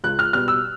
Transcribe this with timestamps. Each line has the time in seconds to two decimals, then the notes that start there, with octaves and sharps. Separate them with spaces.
0.04 C#2 F#6
0.19 F6
0.33 B2 G3 F6
0.48 E6